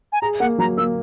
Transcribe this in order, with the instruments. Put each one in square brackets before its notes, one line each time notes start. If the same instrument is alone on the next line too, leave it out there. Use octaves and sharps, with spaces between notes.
[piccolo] G#5
[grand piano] G#4 [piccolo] A#5
[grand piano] A#3 [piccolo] F#5
[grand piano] F#3 [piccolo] A#5
[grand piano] A#3 [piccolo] E6